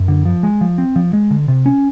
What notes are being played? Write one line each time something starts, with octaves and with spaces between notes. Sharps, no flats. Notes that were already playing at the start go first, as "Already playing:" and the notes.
Already playing: F#2
D3
F3
G#3
F3
C4
F3
G#3
D3
C3
C#4